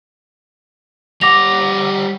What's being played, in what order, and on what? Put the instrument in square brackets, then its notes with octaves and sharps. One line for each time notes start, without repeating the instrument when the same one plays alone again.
[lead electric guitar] G3 F#5 [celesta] D6 A#6 F7